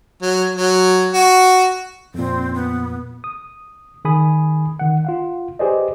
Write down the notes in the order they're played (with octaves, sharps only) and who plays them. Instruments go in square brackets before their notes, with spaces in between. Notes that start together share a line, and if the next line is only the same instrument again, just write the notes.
[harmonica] F#3
F#3
F#4
[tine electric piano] F2 A#2 [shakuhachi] C4
[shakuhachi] B3
[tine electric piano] D#6
D#3 G#4 G#5 B5 D#6
D#3 F#5
F4 F5 F#5
G4 G#4 B4 C5 D5 D#5